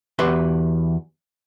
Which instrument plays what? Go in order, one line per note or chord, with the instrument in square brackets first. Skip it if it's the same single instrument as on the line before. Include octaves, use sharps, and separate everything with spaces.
[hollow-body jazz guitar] E2 F#4 G4 B4 E5 C6